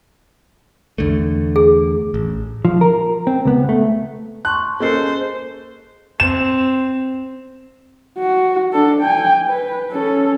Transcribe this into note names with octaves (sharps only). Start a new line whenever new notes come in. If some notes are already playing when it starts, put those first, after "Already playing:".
E2 D3 A3
G#4
A1
F3
A#4
C4
C#2 B3
A3
A5 C6 C#6 F#6
A#3 C#4 G#4 A4 C5 D#5 C7
C4 E7
F#4
D4 A4
G5 G#5
B4
C#4 A4